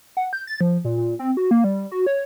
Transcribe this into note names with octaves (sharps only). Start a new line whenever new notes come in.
F#5
G6
A6
F3
A#2
A#2
C4
F#4
A#3
G3
F#4
C#5